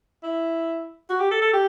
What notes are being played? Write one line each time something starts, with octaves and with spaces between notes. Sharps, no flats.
E4
F#4
G4
A4
A4
G4